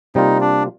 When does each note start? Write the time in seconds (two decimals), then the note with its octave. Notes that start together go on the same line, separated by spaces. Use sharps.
0.15 C3 G3 A#3 D#4 F4
0.41 D4